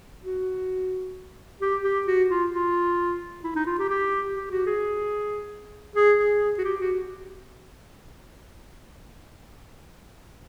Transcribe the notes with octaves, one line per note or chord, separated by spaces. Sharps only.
F#4
G4
G4
F#4
F4
F4
E4
D#4
F4
G4
G4
G4
F#4
G#4
G#4
G#4
F#4
G4
F#4